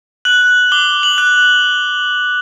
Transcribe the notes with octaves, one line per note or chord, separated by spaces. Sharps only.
F#6 F#7
D6 G7
F#7
F#6